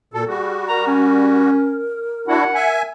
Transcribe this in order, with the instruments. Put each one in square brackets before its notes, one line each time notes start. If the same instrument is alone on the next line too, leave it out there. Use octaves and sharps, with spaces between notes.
[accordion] A#2 A4 [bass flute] F#4
[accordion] G3 F#4 [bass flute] G#4
[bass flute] A#4 [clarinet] A#5
[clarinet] C#4
[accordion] D4 E4 F#4 [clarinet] F#5
[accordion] E5 G#5